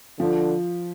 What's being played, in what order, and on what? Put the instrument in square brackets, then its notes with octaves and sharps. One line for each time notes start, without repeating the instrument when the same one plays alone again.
[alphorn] D3 [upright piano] F3